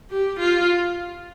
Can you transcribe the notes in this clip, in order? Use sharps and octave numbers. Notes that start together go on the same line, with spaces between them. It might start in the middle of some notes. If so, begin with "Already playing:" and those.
G4
F4